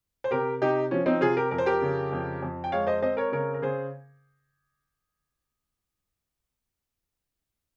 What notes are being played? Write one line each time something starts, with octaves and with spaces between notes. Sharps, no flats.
C5
C3 G4 A#4
C3 D#4 G4
F3 C#4
C4 D#4
C3 F4 G#4
G4 A#4
F2 A#4
C5
G4 A#4
C#3
F2
F2
G5
G#3 C#5 F5
C5 D#5
C4 C5 D#5
A#4 C#5
C#3 A#4 C#5
A#4
C#3 G#4 C5